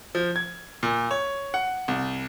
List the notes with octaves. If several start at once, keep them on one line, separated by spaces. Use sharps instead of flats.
F3
G#6
A#2
C#5
F#5
C2